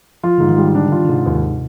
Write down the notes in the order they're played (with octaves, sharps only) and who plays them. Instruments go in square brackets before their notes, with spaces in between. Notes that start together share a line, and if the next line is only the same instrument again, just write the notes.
[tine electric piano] F3 [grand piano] F4
[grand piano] G#2 [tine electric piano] D3
[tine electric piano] D#3
[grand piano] G3
[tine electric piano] D3 [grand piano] D4
[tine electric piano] D3
[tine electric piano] D#3 [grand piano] F4
[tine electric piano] D3
[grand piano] G#2 [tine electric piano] C3
[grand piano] D#2